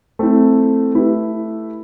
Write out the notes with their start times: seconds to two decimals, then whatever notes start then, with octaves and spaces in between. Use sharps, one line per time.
0.19 A3 C4 E4
0.95 A3 E4 G4 B4